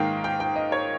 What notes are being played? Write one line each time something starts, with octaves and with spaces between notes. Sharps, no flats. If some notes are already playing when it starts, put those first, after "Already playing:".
Already playing: G#2 D#3 A#3 F5 G5
G5
G5
D#5
C#5